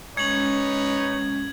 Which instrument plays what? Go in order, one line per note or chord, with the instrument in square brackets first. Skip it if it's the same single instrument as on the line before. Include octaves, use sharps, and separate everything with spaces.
[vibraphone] G#3 C#4 [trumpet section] D#4 B4 C#5 [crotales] G#6 F#7